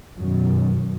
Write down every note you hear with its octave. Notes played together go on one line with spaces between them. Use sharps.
F#2 B2 D#3